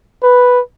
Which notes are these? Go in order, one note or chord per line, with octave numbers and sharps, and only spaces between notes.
B4